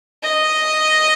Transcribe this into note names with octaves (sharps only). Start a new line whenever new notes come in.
D#5